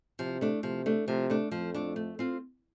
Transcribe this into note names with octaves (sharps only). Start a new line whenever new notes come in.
C3 F3
A3 D4
C3 F3
A3 D4
C3 F3
A3 D4
F2 F3
A3 D4
A3
C4 F4